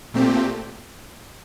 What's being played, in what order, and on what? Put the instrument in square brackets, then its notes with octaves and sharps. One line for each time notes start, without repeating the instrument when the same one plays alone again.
[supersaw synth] A#2 A3 C4 G4